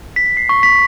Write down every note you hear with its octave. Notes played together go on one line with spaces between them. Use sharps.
B6
C7
C#6
B6